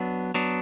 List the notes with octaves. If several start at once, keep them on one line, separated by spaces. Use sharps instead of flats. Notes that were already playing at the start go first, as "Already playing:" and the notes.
Already playing: F#3 B3 D4
F#3 B3 D4